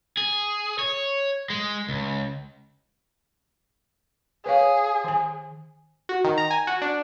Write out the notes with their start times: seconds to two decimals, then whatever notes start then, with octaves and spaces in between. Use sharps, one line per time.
0.17 G#4
0.79 C#5
1.50 G#3
1.89 C#2
4.46 G#4 B4 C#5 F5
5.04 D#3 G#5
6.09 F#4
6.24 D#3
6.38 A#5
6.51 G#5
6.67 F#4
6.82 D4